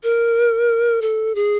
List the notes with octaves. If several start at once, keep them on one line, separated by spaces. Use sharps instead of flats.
A#4
A4
G#4